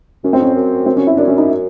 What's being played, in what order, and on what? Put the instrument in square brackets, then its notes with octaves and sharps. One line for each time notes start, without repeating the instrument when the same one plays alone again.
[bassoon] F#2 [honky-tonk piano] C#4
[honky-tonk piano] C4
[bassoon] F2 [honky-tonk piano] C#4
[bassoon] F#2
[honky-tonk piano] C4
C#4
E4
[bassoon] F#2 [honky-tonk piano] D4
[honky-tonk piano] C#4
D#4